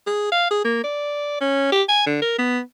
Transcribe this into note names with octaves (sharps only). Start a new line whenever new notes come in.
G#4
F5
G#4
A#3
D5
C#4
G4
G#5
D3
A#4
B3